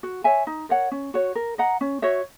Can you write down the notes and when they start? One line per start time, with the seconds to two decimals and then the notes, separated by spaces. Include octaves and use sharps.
0.03 F#4
0.24 C#5 E5 G#5
0.47 D#4
0.69 A#4 C#5 F#5
0.91 C#4
1.14 F#4 C#5
1.35 A#4
1.58 D#5 F#5 A#5
1.81 C#4
2.02 F#4 C#5 E5